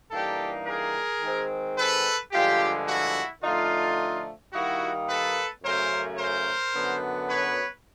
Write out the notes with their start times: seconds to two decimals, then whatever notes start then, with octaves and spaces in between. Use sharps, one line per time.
0.11 G2 E3 G3 A#3 D#4 G4 A4
0.66 G#4 A#4
1.22 D#3 G#3 C4
1.77 A4 B4
2.32 G2 D3 F3 G#3 F4 G4
2.87 E4 F#4
3.42 D3 F3 A3 D#4 F4
4.52 D#3 G3 A#3 D#4 E4 F#4
5.08 A4 B4
5.63 F#2 C#3 F#3 A3 C#4 A#4 C5
6.18 A#4 C5
6.74 F#2 D3 F#3 B3
7.28 B4 C#5